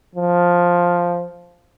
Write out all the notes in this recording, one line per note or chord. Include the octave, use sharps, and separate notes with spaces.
F3